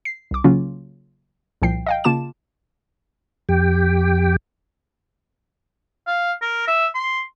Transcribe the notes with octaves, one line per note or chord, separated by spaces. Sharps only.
C7
C2 D6
C#3 F#3 A#3 C#4 F4
C2 A#2 F3 G5 C7
D#5 F5 G5
C#3 A#3 F4 A5 D6 E7
F2 G4 G5
F5
A#4
E5
C6